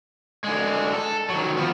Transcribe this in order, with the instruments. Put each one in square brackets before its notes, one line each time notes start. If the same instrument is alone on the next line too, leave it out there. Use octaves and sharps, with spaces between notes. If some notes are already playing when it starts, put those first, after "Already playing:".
[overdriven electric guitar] D3 G#3
A4
D#3 F#3
F3 B3